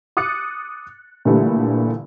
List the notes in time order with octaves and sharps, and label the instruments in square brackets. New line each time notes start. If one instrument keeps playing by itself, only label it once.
[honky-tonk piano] D6 D#6 F#6 A6 C#7
A#2 D3 E3 G3 A3 E4